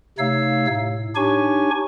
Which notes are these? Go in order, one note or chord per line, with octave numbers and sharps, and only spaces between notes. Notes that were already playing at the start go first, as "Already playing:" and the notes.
C3 A3 D#4 C#5 F5 E6
A2
D4 D#4 G4 C#5 G#5 C#6